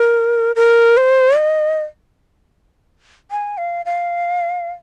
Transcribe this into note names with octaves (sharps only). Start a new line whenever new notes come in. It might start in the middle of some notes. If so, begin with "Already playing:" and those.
Already playing: A#4
A#4
C5
D#5
G#5
F5
F5